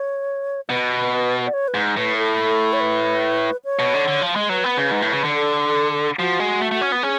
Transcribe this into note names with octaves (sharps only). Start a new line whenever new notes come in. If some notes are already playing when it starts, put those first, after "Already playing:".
Already playing: C#5
B2 B4
D5
C#5
B4
G#2
A2 B4
A4
C#5
B4
C#5
B2
D3
D3
F3
G#3
F#3 B4
B3
C#3
G#2
A2
C#3
D3
A4
F3 F#4
G#3
A3
A3
C#4
B3
C#4 G#4